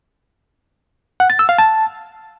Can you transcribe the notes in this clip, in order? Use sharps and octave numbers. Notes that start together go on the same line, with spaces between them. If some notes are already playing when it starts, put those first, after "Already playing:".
F#5
A6
E6
F5
A5